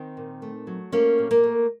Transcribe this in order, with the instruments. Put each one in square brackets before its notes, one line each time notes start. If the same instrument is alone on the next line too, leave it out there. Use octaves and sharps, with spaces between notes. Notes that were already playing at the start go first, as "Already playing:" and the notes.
Already playing: [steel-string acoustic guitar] D#3 C4 D#4
A#2
A3
F#3
A3 A#3 C#4
A#2
A#3
A3